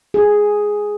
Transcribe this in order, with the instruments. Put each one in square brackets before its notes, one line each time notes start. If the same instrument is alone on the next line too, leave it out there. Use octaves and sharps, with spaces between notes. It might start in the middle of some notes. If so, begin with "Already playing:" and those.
[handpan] G#4